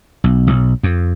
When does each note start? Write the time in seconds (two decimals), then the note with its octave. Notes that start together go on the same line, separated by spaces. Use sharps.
0.24 B1
0.47 B1
0.83 F2